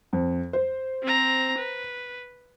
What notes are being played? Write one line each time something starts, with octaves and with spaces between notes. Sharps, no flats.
F2
C5
C4 A#5
B4